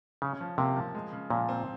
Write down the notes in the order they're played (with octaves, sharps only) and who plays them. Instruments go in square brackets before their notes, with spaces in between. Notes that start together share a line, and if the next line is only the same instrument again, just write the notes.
[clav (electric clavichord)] C#3 [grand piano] C#4
[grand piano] F3
[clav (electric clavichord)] C3 [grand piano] A#3
[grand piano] F3
G#3
C#3
[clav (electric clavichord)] A#2 [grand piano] F3
[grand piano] C4